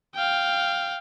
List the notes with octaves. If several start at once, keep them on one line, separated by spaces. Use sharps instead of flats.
F5 G5